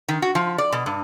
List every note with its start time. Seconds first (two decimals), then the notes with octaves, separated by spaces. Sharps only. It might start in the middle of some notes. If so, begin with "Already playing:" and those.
0.08 D#3
0.22 F#4
0.35 F3
0.58 D5
0.72 B2
0.86 G2